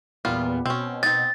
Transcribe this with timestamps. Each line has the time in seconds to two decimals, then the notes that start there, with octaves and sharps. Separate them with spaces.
0.25 E2 A#2 G3 B3 F4
0.66 B2 C4 C#4
1.03 C4 D#4 A6